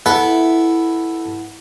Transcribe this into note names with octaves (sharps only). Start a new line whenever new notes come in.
B3 E4 A4